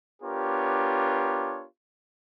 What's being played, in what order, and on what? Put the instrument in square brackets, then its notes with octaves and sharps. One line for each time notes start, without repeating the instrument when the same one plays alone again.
[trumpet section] B3 D4 F4 G4 A#4 C#5